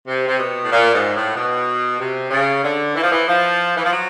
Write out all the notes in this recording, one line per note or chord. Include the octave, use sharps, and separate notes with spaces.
C3
C3
B2
A2
A#2
G#2
A2
B2
C3
C#3
D3
E3
F3
E3
F3
E3
F3
F#3